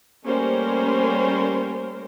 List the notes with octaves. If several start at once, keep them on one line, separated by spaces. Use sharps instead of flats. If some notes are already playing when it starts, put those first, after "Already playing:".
G3 A3 A#3 C#4 A#4 C5